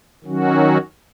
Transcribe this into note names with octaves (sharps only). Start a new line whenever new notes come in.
D#3 F#3 C#4 F#4